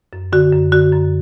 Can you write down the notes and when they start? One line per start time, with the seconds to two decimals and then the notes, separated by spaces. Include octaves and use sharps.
0.13 F#2
0.33 D3 F#4
0.53 F#2
0.72 D3 F#4
0.93 F#2